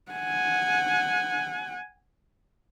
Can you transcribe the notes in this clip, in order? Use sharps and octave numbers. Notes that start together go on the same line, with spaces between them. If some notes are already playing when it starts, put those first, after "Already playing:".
F#5 G#5